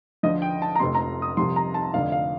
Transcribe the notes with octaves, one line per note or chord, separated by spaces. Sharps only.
D2 D3 F3 D#5
G5
A5
A#5
F1 F2 C3 C6
A#5
D#6
C2 C3 F3 C6
A#5
A5
F1 F2 D3 F5
F5